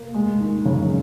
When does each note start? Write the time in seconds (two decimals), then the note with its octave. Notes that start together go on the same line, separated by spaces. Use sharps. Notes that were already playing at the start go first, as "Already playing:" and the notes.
Already playing: A#3
0.14 G#3
0.40 D#3
0.65 F#2 C#3